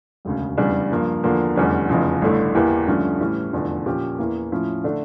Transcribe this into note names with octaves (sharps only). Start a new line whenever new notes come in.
E1 D2 C#3
F1 E2 C#3 G3 D4
G2 F3 A#3
E2 D3 F3 A#3
F1 E2 D3 G3 C#4
F1 E2 C#3 F3
A1 G2 D3 A3 E4
E2 E3 A#3 E4 G4
G2 D3 F3 A3 C#4
A2 E3 G3 C#4
F1 E2 D3 F3
A#2 F3 C#4 G4
E2 E3 A#3
A2 F3 C#4 E4
D3 A3 D4